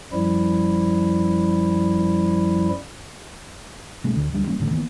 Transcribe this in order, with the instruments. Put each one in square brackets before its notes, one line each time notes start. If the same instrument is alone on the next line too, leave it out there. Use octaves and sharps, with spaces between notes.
[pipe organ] F#2 F3 G3 E4
[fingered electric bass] B2 G#3 A3 C#4
D2 D3
D2 F#3 G3 D4
E3 G3 A#3 C#4
E1 A1 D3 A3
D#3 E3 A#3 B3